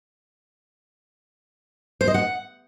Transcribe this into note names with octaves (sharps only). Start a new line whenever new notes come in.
C5
D#5
F#5